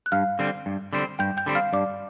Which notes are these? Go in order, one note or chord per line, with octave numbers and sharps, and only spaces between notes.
F#6
G2 F5 F6
D3 G3 C4
G2
D3 G3 C4
G2 G5 G6
G5 G6
D3 G3 C4
F5 F6
G2 D5 D6